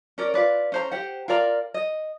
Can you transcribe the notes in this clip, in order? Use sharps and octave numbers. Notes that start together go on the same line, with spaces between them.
C#4 A#4 D5
F4 B4 D5
C#4 C5 A#5
G4 C5 F#5
F4 A#4 D5 A#5
D#5